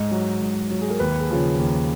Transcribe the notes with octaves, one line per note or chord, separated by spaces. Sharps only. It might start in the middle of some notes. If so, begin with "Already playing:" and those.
Already playing: G#2 D#5
F#3
G#2
F#3
G#4
A#4
D#2 B4
G#4
C#3 F3
D#2